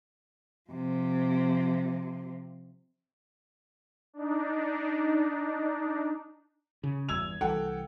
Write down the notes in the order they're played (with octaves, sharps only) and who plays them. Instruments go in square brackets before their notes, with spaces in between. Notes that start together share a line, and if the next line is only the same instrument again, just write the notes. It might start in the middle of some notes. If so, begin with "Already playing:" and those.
[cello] C3 F3
[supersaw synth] D4 D#4
[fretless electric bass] C#3
[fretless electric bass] G1 E2 [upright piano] E6 G#6 F7
[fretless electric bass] C2 E3 [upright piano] A4 F#5 G5